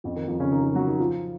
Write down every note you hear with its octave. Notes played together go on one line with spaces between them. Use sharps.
F2 F3
D#3
F2 F3
C#3 C#4
D#3 D#4
D#3 D#4
F#3 F#4
D#3 D#4
F3 F4